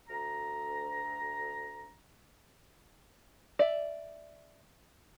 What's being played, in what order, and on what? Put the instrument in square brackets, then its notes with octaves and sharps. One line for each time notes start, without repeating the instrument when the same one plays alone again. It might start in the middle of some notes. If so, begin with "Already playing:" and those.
[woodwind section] D2 A#5
[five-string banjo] D5 E5